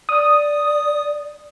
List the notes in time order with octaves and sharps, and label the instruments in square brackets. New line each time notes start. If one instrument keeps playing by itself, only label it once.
[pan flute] D5 [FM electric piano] D#6